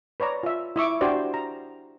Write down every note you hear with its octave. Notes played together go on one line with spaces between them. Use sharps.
B4 C#5 D5 A#5
F4 E5
E4 E5 C#6 D6
D4 F#4 G4 C5 D5
A#5